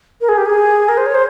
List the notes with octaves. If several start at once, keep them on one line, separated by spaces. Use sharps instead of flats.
A#4
G#4
G4
G#4
A#4
C5
C#5
C5